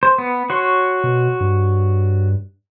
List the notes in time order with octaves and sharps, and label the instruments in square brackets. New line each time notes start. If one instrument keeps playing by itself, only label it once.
[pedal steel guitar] C5
B3
F#4 C#5 C6
[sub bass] B2
G2